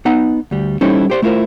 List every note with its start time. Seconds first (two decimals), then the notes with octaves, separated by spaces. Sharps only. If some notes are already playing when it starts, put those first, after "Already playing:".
0.05 B3 D#4 F#5 A#5
0.51 D2 G3
0.81 G3 C#4 D#4 E4 A4 C5
1.10 G4 C5 D5
1.22 A3 E4 F4 A#4 C5